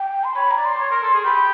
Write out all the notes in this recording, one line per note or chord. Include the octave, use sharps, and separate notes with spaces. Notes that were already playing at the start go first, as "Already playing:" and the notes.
Already playing: G5
C6
C#5 B5
A#5
D5
C6
C#5
A#4
A4
G#4
G4 B5